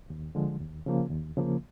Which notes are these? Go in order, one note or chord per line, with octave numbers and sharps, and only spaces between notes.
D#2
D3 F3 G#3
D#2
C#3 F3 A#3
D#2
C#3 F3 A#3